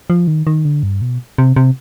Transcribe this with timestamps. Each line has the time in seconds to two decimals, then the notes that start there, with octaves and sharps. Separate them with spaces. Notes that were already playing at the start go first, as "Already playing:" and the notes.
0.10 F3
0.27 D#3
0.47 D#3
0.65 D3
0.83 G2
1.02 B2
1.38 C3
1.56 C3